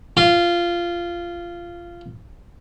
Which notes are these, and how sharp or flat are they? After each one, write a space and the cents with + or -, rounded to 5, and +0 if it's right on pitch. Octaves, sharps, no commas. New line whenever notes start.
F4 -15